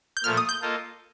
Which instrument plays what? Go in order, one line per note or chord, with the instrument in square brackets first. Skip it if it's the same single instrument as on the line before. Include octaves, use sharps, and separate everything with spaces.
[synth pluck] G6
[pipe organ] A#2 F3 A3 [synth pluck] F6
[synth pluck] D#6
G6
[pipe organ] A#3 F4 A4 D#5